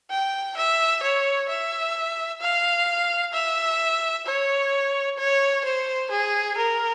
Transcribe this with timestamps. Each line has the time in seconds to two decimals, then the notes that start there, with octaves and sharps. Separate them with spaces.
0.10 G5
0.57 E5
1.03 C#5
1.49 E5
2.41 F5
3.33 E5
4.26 C#5
5.18 C#5
5.64 C5
6.11 G#4
6.57 A#4